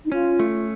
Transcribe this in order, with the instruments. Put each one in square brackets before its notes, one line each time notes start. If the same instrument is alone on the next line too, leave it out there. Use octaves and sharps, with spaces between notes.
[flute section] D#4
[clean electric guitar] C#4 [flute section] F4
[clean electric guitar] A3